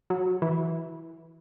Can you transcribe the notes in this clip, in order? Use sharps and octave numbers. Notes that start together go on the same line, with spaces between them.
F#3
E3